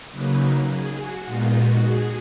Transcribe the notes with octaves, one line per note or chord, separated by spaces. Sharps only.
C#3 F#3 A#3 D#4 B4
G#4
F#4
A#2 G#3 B3 D#4 F4
F#4
G#4